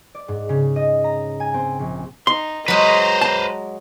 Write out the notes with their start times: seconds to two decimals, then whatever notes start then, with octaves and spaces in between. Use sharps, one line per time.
0.15 D5
0.28 G#2
0.49 C#3
0.76 D#5
1.04 A#5
1.40 G#5
1.54 C4
1.79 A#1
2.27 D#4 C6
2.68 F#3 G#3 B4 C5 A#5
3.21 A5